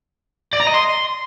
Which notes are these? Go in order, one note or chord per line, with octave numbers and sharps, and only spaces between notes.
D5
A#5
D#5
C6